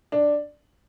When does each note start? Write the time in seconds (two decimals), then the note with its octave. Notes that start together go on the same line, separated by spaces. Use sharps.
0.12 D4